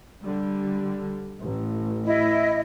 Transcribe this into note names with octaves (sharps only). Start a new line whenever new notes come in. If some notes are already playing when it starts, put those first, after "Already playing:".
D3 G3
A1
E4 D#5